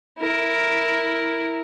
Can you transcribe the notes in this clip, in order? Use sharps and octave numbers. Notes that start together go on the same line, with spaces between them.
E4 A#4